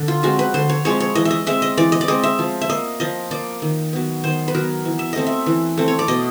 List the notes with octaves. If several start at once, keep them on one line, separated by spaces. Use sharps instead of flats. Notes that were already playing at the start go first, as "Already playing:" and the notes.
Already playing: D3
F4
F3 G#3 C4 F#4
B4
D3 C5
C#5
F3 G#3 C4 C#5
C#5
E3 D#5
E5
D#5
G#3 C4 E5
D#5
E3 D5
D#5
D5
G#3 C4 D#5
E5
F3
E5
A#3 D#5
F3 D#5
A#3 D5
D#3
F#3 B3
D#3 C5
B4
F#3 B3 A#4
E3
E5
A3 C4 D#5
E5
E3
A3 C4
C#5
D5
B2 D#5